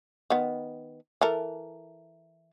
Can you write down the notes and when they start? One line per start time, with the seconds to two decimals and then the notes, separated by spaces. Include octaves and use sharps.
0.30 D#3 B3
1.21 E3 A4 A#4